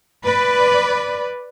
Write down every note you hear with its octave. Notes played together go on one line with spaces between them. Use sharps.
B4 D5